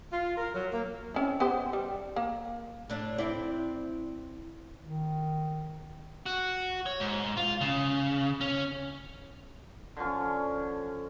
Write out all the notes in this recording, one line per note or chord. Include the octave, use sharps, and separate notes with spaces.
F4
A#4
F#3
A#3
C4 C#4 E4
B3 G4 C5
G3
A#3
A2 D4
C4 E4 D5
D#3
F#4
C#5
G#2
F4
C#3
C#4
D3 F3 C#4